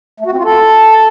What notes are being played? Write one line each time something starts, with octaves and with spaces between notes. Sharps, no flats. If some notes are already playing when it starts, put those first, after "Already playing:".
A3
F#4
C4
F4
A4